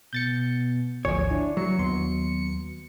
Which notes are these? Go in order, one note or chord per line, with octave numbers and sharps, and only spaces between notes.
B2 G6 A6 C#7
G#1 D2 F3 C#5 G#5
D4 E4
F#3 C#7
D#2 B3 C6